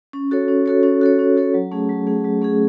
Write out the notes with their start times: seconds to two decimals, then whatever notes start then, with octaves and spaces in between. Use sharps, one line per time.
0.13 C#4
0.31 F#4 A4 C#5
0.48 C#4
0.66 F#4 A4 C#5
0.83 C#4
1.01 F#4 A4 C#5
1.19 C#4
1.37 F#4 A4 C#5
1.54 F#3
1.72 A3 C#4 G#4
1.89 F#3
2.07 A3 C#4 G#4
2.24 F#3
2.42 A3 C#4 G#4